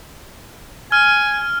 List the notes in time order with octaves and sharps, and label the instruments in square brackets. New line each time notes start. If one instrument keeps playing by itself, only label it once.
[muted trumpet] G#5 [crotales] F6